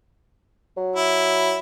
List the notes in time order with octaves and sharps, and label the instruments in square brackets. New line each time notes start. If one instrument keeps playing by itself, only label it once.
[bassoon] F#3
[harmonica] E4